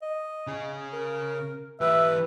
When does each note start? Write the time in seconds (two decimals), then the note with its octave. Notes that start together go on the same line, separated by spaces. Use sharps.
0.02 D#5
0.47 C#3 G#4
0.93 A#4
1.81 E3 G4 B4 E5